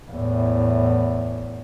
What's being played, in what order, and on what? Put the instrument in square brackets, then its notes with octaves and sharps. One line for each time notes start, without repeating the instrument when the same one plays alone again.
[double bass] E2 A2